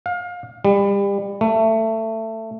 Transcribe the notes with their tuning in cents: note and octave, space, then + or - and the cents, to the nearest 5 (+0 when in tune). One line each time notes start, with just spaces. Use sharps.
F5 +30
G3 +30
A3 +20